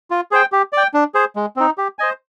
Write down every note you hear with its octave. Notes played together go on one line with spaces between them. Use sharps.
F4
G#4 C5 G5
G4
D5 G5
D4
G#4 C5
G#3
C4 D#4
G4
C5 D#5 G#5